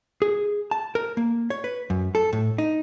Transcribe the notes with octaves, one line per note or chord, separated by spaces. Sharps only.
G#4
A5
A#4
A#3
C#5
B4
F#2
A4
A2
D#4